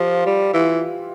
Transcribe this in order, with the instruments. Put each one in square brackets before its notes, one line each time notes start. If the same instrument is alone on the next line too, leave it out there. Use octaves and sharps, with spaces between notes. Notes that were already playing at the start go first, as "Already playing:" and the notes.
Already playing: [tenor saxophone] F3 [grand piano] F4 G4
[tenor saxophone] G3
E3